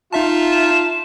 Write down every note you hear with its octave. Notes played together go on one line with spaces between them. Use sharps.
D#4 F4 E5 A5
E7